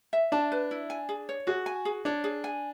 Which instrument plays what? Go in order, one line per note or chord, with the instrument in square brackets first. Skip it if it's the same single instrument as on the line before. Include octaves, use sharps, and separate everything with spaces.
[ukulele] E5
[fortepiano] D4 [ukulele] A5
[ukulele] B4
E4
G#5
G#4
C#5
[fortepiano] F#4 [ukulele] G#4
[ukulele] G#5
G#4
[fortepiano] D4 [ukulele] C#5
[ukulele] G#4
G#5